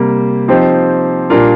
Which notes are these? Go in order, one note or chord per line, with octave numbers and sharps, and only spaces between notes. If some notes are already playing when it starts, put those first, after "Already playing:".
Already playing: C3 G3 A#3
F3 C4 D#4 G4 C5
A#2 G3 D4 F4 A#4